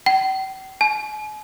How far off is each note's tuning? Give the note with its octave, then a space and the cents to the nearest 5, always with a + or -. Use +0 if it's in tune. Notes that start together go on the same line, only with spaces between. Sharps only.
G5 -40
G#5 +45